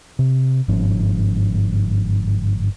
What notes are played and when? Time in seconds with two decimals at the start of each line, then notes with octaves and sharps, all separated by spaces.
0.19 C3
0.68 G1 G#2 F3 C#4